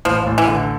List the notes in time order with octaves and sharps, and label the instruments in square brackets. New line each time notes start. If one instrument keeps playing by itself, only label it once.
[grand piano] A1 [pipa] F3
[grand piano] A1
[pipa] E3
[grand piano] D3